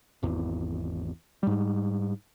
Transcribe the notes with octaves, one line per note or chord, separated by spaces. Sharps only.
G#1 E2
G#2 G3